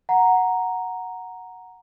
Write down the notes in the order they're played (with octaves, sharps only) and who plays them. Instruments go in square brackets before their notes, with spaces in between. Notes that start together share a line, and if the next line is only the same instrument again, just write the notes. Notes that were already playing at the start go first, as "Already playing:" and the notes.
[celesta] F#5 A#5